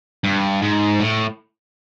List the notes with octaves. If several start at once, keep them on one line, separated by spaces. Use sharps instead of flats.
G2
G#2
A2